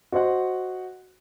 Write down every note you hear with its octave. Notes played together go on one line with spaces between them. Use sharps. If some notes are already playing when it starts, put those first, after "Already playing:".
F#4 C5 D#5 F#5